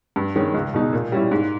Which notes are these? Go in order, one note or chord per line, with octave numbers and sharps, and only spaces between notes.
G2
D#3 G#3 C#4
C#2
B2 G#3 D#4
A#2
G3 C#4 E4
G#2